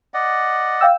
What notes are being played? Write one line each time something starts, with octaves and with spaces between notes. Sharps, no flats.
D5 D#5 F#5
F5 G5 E6